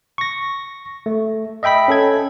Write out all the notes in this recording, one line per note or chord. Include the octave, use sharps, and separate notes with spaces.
C#6 A#6
A3
D#5 E5 G5 B5 B6
C#4 A4 G#6